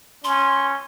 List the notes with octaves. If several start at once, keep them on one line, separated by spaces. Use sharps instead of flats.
C#4 C6